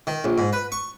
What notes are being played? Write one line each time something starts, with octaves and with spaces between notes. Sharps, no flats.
D#3
A#1
G#2
B4
C#6